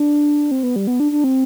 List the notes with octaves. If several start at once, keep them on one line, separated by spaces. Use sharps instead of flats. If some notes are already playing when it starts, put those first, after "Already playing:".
Already playing: D4
C4
B3
G3
B3
D4
D4
C4